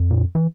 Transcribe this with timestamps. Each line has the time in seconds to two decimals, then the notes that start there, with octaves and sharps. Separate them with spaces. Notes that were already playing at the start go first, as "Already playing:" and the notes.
Already playing: F2
0.11 A#2
0.35 E3